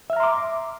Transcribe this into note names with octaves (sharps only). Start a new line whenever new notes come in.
E5 A#5 C6 D6 F6